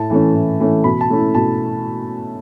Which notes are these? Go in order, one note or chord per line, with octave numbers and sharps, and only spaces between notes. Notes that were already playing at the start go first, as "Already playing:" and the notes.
Already playing: A2 A5
E3 A3 C#4
A2
E3 A3 C#4
B2 B5
A5
A3 C#4 E4
B2 A5